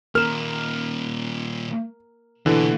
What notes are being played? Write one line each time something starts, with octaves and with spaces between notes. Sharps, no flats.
D#2 A#2 A#4 F6 E7
B2 D3 E3 A#3